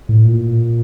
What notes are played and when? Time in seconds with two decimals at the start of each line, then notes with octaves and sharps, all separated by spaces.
0.09 A2
0.25 A#2